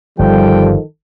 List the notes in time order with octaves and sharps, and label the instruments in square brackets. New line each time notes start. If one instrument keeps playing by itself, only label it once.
[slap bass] G1 [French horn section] D#3 A4 [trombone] F3 [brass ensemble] G3 G5